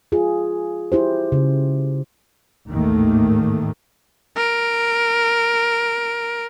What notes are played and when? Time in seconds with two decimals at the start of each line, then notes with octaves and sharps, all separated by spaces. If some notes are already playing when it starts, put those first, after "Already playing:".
0.12 F4 G#4
0.92 E4 G4 C5
1.32 C#3
2.69 A1 D#2 G#2 D#3 A3 A#3
4.36 A#4 D7